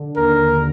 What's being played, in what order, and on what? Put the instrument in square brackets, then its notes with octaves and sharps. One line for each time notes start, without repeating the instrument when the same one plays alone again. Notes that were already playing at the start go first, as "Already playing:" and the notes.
Already playing: [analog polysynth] D3
[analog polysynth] D#2 [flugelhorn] A#4
[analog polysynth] D3